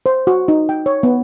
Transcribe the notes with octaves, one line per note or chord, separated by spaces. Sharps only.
C5
F#4
D#4
G5
C#5
B3